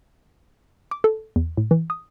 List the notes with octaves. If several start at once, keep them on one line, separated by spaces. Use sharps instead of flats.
D6
A4
E2
A2
E3
D#6